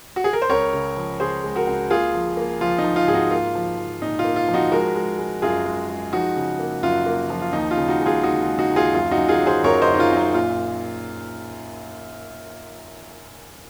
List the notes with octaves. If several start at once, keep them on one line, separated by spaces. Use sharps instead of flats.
F#4
G#4
A#4
C5
C#2 A#4 C#5
C#3
F3
C#3 G#4 C5
G#3
F#4 A#4
C#2
A#3 F4 G#4
F3
A#3
F3 F4
D#4
F3
F4
G#2 G#4
D#4 F#4
A#3 F4
F3
F3
A#2 D#4
F4
A#3
F4
F3
D#4 F#4
G#3 F#4 A#4
G#3
G#3
F#2 F4 G#4
G#3
G#3
F3 D#4 F#4
C#3
A#3
F#2 F4
A#3
F3
F4
D#2 D#4
F4
C#3
D#4 F#4
G#3
F4 G#4
D#2 D#4 F#4
F4
G#3
D#4 F#4
D#2
F4 G#4
F#2 F4
D#4 F#4
F#2
F4 G#4
F#3
G#4 C5
F#2 A#4 C#5
C5 D#5
F#2
D#4
F4
F#2
D#4
A#2 F4